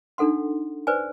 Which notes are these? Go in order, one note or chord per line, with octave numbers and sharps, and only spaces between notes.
D4 D#4 A4 F#5 C6
B4 C5 D5 G#5